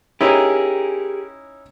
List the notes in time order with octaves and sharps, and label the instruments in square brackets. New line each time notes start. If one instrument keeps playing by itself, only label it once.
[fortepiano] C#4 D#4 E4 [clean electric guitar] G4 G#4 A#4